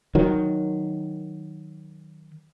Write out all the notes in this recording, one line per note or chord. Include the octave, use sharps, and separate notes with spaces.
D#3 F#3